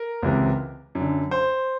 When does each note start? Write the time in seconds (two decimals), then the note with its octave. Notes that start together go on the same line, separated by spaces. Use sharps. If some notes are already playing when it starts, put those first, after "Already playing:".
Already playing: A#4
0.23 C#2 C3 E3
0.95 F#2
1.00 D3
1.31 C5